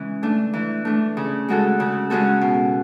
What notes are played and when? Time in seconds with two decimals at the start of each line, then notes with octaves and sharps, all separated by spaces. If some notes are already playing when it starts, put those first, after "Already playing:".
Already playing: C#3 E3 G#3 C#4
0.23 A3 D4
0.53 E3
0.85 A3 D4
1.17 C#3
1.48 G#3 C#4 F#4 A4
1.80 C#3
2.10 G#3 C#4 F#4 A4
2.41 B2